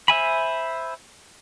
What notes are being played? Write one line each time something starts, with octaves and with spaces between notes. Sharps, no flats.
C5 E5 G#5 B5